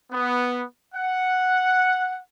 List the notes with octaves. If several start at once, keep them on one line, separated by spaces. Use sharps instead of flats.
B3
F#5